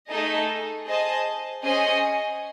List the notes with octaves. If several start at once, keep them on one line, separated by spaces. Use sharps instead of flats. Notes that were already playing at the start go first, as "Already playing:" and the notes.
A3 D#4 G#4 D#5 A5
G#4 C5 D#5 A5
C#4 G#4 C5 D#5 G#5